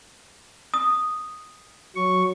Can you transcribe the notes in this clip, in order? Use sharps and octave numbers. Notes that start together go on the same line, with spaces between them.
D#6
F#3 C#6